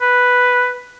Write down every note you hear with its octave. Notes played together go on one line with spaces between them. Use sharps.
B4